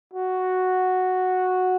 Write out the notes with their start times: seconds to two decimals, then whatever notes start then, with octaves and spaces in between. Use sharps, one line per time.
0.14 F#4